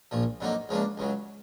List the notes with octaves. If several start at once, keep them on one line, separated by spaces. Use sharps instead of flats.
A#1 A#2 F3
F2 D3 F#3 A#3 D#4
C#2 C#3 F3 A#3 D4
C#2 C#3 F#3